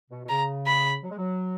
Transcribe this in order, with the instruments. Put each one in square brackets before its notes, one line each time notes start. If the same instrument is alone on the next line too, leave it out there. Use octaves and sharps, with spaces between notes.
[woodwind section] B2
B2
[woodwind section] C#3 [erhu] A#5
[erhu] B5
[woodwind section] F#3
G#3
F#3